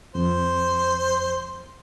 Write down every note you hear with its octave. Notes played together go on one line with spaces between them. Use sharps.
F2 C5